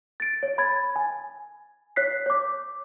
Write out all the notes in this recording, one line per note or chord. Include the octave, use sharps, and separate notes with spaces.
A6 D7
C#5
B5 G#6 A6
G#5
C#5 F#6 B6 C7
C#5 D6